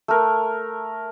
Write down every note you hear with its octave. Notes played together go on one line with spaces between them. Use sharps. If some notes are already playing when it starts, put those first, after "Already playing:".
A3 A#4